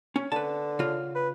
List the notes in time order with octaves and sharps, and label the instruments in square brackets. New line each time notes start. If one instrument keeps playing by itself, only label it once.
[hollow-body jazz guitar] C#4
[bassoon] D3 [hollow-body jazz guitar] B4 A5
[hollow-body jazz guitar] C#3 F4
[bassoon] B4